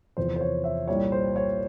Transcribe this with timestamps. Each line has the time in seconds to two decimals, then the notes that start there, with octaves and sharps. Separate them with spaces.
0.17 E2 C3 F3 C5
0.36 C5
0.41 C#5
0.64 E5
0.88 C2 A#2 G3 C#5
1.12 C5
1.36 C#5